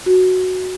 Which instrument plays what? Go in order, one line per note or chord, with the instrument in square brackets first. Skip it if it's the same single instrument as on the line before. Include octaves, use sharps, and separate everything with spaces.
[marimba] F#4